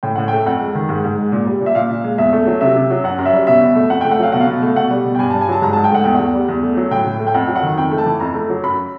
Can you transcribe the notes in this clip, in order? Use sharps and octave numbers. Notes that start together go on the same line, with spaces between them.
A2 G5
A2 F#5
A3 G5
F2 F#5
G#3
D#3
G#2
G#2
G#3
A#2
G3
A#2
E5
A#2 F5
A#2
G#3
E2 E5
A3
F#3
C3 E5
C3
F#3
F#2 F#5
F#2
E5
G3
B2 E5
B2
A3
F2 F#5
A3 G5
F#5
F#3 F5
B2 F#5
F5
B2
A3
B2 F#5
G3
B2
G5
G2 G#5
G2 A5
G#5
F#3 A5
G#2 A#5
G#2 A5
G5
A3 F#5
E2 G5
E2 F#5
G3
E2
A3
F#3
A2 G5
A2
A3
G5
F2 F#5
F#3
F#5
D#3
F2 G5
A3
A5
E3
F2 A#5
A3
F#3
F#2 B5